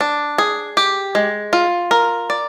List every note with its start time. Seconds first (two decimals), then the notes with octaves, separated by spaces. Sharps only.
0.01 D4
0.38 G#4
0.77 G4
1.15 G#3
1.53 F4
1.91 A#4
2.30 D5